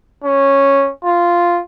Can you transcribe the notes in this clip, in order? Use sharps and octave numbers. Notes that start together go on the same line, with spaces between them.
C#4
F4